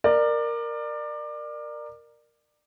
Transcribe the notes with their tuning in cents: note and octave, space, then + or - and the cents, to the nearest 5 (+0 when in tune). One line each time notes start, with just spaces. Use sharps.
A#4 +0 D5 +25